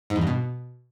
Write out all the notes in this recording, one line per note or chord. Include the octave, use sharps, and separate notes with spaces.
G#2
E2
G2
B2